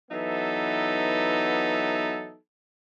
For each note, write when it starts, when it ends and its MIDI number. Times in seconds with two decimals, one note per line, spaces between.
0.11 2.36 52
0.11 2.36 54
0.11 2.36 59
0.11 2.36 63
0.11 2.36 69
0.11 2.36 76